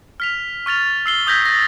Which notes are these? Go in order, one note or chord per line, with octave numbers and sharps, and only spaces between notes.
F6 B6 F7
C#6 F6 A6 F7
E6 C7 G7
D#6 E6 G6 G#6 A#6 B6
A6 A#6